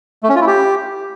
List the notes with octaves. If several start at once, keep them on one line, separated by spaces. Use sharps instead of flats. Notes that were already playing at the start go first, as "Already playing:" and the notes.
A3
C#4
F4
E4
G4